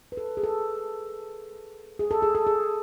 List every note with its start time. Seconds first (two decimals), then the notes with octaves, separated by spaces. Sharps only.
0.12 B4
0.17 A4
0.37 G#4
0.44 A4
1.99 G#4
2.11 A4
2.23 G#4
2.35 A4
2.47 G#4